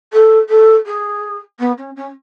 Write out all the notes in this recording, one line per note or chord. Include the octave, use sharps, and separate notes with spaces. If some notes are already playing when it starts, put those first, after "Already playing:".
A4
A4
G#4
B3
C#4
C#4